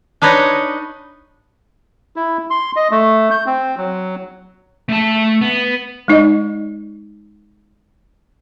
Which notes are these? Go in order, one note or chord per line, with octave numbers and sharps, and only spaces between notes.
D4 D#4 B4 C#5 D#5
E4
C6
D#5
A3
G6
C4
F#3
A3 A5
B3
G#3 D#4 D5 D#5